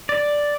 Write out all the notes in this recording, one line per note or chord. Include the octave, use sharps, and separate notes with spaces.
D5